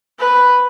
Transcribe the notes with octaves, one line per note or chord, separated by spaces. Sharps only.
B4